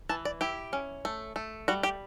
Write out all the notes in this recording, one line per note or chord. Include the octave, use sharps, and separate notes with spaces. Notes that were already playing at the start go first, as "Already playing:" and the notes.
E3 A5
D5
E4 G4
C#4
A3
A3
G3 F#4
G4